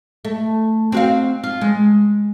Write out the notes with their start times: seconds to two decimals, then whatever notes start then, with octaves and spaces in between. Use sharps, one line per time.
0.25 A3
0.92 C4 F#4 F5
1.44 F4
1.61 G#3